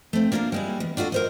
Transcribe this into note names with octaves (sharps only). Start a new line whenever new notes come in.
A3 C4
A#3 D4 F4 G4 A#4
G3 G#3 E4
E2
D4 F4 F#4 A4 D#5
A#4 C5 D#5